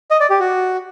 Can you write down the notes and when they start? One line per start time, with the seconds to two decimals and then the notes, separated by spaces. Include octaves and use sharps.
0.11 D#5
0.20 D5
0.30 G4
0.40 F#4